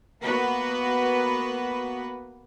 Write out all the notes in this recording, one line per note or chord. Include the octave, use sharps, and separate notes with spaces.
A#3 B3 F#4 B4